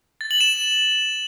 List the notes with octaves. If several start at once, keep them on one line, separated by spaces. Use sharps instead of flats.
A6
F#7
E7